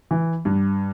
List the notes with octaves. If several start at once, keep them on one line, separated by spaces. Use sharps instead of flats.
E3
G2